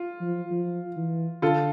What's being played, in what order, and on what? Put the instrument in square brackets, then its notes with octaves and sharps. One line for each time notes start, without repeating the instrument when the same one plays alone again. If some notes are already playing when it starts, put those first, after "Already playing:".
Already playing: [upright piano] F4
[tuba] F3
F3
E3
[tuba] D3 [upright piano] F4 A4